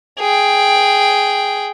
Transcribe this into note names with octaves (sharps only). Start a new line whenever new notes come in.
G#4 G5